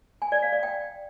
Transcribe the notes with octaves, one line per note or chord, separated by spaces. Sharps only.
G#5
D5
F5
D5
G5